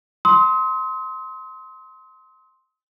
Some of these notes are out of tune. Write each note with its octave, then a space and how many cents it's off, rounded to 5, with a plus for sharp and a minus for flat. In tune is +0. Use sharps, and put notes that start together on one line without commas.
C6 +0 D#6 +45